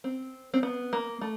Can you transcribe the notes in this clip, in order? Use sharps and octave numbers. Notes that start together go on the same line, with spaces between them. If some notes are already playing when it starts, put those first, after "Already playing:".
C4
C4
B3
A#3
A3